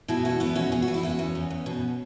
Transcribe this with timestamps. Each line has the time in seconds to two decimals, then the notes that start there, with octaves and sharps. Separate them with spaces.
0.08 B2 E4 G#4
0.25 E2 C#4 F#4
0.40 E2 B3 E4
0.55 B2 C#4 F#4
0.72 E2 G#4
0.82 F#4
0.88 E2
0.94 E4
1.03 E2 C#4 F#4
1.19 E2
1.35 E2
1.50 E2
1.66 B2